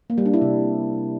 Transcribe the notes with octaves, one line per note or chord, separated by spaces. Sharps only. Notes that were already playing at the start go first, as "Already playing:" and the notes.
A#3
G3
D4
E4
C3